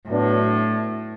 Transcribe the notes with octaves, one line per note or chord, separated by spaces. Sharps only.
A2 F#3 B3 D4